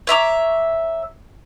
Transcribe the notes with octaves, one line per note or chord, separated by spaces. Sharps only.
C#5 E5 A#5 D6